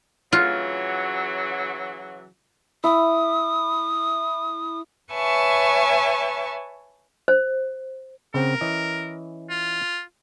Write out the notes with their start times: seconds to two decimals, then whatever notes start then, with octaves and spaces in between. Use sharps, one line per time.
0.33 C#3 E3 F#3 F4
2.84 E4 D#6
5.13 B4 C#5 E5 G#5 A5 C#6
7.28 C5
8.34 C#3 C4 A#4 F#5
8.61 E3 C#4 D#5
9.50 F4